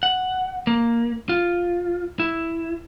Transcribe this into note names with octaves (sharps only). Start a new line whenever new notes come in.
F#5
A#3
F4
E4